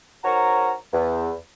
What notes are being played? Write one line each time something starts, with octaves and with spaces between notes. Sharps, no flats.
G#2 F#4 A#4 C#5 A#5
E2